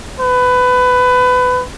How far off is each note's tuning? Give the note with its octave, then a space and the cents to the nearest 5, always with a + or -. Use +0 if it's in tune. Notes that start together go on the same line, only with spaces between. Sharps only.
B4 +20